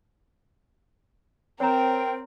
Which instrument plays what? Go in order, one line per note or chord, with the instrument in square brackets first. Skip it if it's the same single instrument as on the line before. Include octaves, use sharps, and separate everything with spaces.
[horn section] C4 [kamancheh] A#4 [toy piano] C#5 A#5 [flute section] G5